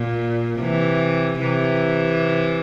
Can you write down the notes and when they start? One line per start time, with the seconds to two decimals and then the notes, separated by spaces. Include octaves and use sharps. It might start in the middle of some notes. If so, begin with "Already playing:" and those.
Already playing: A#2
0.60 C3 E3
1.40 C3 E3